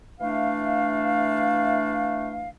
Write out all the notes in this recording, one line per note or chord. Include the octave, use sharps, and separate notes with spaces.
E3 A3 D4 F5